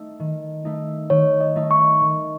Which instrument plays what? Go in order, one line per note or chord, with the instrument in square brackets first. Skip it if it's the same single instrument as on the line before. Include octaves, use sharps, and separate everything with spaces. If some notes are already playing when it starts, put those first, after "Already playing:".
Already playing: [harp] A3 D#4
D#3
A3 D#4
[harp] D#3 [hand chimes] C#5
[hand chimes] D#5
[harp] A3 D#4
[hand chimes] C#6
[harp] D#3